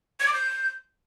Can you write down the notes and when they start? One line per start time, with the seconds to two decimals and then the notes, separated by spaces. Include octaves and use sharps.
0.20 G#6
0.27 D6
0.33 G6